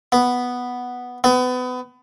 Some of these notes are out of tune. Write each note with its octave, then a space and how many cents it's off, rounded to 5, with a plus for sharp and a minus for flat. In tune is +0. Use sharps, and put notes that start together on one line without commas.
B3 +0
B3 +30